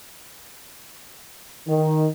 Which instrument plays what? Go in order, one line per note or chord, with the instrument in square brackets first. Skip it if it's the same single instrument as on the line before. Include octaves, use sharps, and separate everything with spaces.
[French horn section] D#3